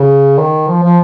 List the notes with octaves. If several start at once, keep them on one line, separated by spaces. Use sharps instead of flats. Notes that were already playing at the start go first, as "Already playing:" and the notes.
Already playing: C#3
D#3
F3
F3